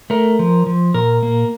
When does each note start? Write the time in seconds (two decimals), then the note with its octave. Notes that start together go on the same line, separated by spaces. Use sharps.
0.10 A3 A#4
0.39 F3
0.66 F3
0.94 A#2 A#4
1.23 A#3